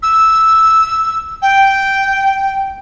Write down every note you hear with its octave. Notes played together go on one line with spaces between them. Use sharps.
E6
G5